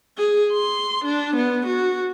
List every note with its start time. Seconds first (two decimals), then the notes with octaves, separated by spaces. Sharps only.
0.18 G#4
0.53 C6
1.05 D4
1.36 B3
1.66 F#4